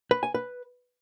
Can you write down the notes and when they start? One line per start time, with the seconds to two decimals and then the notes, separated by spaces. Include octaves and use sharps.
0.11 B4
0.23 G#5
0.34 B4